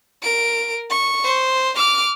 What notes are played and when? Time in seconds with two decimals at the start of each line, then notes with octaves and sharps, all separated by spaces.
0.23 A#4 D7
0.90 C#6
1.24 C5
1.76 D6 F6